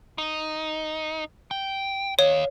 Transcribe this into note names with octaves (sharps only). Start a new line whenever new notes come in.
D#4
G5
C#5 D#5 F5